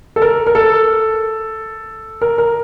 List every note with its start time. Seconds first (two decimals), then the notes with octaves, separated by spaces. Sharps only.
0.16 A4
0.22 A#4
0.47 A#4
0.55 A4
2.22 A#4
2.38 A#4